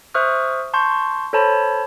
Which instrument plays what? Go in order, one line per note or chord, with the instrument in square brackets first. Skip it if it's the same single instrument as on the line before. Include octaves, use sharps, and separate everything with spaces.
[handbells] C5 E5 C#6 D#6 F6 F#6
A5 C6 C#6 G6
A4 C5 C#5 A5 B5